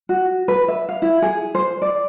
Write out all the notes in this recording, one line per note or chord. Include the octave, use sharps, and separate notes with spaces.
F#4
B4
E5
F5
E4
G#4
C5
D5